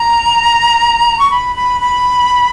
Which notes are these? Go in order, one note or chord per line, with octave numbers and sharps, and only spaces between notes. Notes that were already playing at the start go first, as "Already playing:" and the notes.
Already playing: A#5
C#6
B5
B5
B5